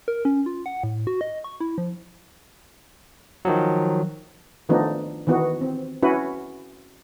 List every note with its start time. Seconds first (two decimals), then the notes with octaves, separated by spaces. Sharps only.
0.08 A#4
0.25 C#4
0.46 F4
0.66 F#5
0.84 A2
1.07 F#4
1.21 D#5
1.44 C#6
1.60 E4
1.78 F3
3.45 D#3 F3 F#3
4.69 D#3 F3 A3 B3 D4 D#4
5.27 D#3 E3 B3 F#4
5.61 C4
6.02 C#4 E4 F#4 B4